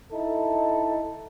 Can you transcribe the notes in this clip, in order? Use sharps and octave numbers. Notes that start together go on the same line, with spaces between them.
D#4 E4 A4